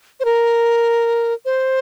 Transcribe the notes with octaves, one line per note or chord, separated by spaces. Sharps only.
C5
A#4
C5